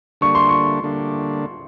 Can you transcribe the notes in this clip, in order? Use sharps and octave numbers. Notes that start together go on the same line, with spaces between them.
D3 G3 A#3 D4 C#6
C6
C#6
D3 G3 A#3 D4